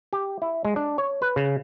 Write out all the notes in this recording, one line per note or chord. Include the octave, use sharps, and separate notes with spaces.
G4
E4
G#3
D4
C#5
B4
C#3